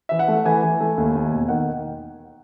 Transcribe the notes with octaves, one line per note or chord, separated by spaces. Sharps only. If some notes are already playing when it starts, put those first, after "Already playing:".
E3 E5
F#5
A3
E3 G#5
E3
A3
D#2
D#2
E1
D#3 F#5